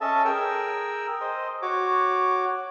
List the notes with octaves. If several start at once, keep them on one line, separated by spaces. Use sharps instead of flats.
C#4 A4 D#5 E5 A5
G#4 A#4 G5 E6
C5 D#5
F#4 C#5 D6